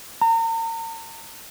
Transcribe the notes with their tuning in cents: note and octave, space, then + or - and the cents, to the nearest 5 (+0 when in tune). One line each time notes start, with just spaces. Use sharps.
A#5 -40